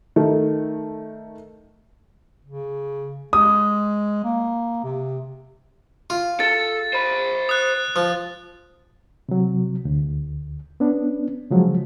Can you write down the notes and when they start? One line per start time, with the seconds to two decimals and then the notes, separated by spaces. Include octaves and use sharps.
0.16 D#3 A3
2.45 C#3
3.33 G#3 D#6
4.24 A#3
4.84 C3
6.10 F4
6.40 A4 A6
6.93 C5 B5
7.49 D#6 F#6
7.96 F3
9.29 C3 F#3
9.85 D2
10.80 B3 C#4 D4
11.51 C#3 F3 F#3 G#3